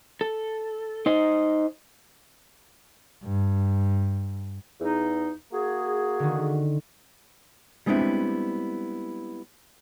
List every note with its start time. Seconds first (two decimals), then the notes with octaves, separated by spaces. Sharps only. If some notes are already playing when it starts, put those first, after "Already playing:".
0.21 A4
1.06 D#4 C5 D#5
3.24 G2
4.81 E2 D#4
5.53 A#3 F#4 G#4
6.19 D3 D#3
7.86 G3 G#3 B3 C4 D4 E4